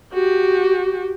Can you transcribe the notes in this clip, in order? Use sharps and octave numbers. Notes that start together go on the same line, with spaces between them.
F#4 G4